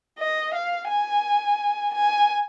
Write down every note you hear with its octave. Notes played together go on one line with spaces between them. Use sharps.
D#5
F5
G#5
G#5